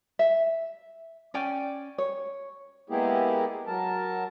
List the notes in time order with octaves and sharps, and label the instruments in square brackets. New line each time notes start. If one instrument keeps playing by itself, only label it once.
[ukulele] E5
C#4 D5 G5 G#5
C#5
[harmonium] G#3 A#3 B3 E4 G4 G#4
F#3 A#4 A5